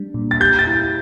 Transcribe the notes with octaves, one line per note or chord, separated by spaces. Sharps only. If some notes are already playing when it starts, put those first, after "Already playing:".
Already playing: G3 D4
A#2
A6
G4 G6
A6
E4